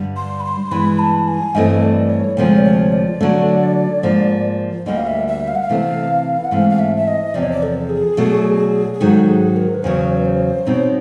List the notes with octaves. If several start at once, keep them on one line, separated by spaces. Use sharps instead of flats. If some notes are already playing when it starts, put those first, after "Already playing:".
Already playing: G2 D3 G3
C6
B5
C6
G2 E3 G#3 B3 B5
A5
G#5
G2 E3 A3 C4 D#5
D5
C#5
D2 C3 F3 G#3 C#5
D5
C#5
D5
D3 F#3 A3 D4
G#2 F3 A#3
D2 D3 G3 A#3 D#5
F5
E5
E5
F5
F#5
F5
C3 E3 A3 C4
F#5
G#2 E3 A3 C4 F5
F5
E5
E5
D#5
E2 C3 F3 D5
C#5
D5
A4
G#4
B2 F#3 A3 D4
G#4
G#2 D#3 F#3 A4
G#4
A#4
B4
E2 C#3 F#3 C5
B4
C5
B2 G3 C4 D#4 C#5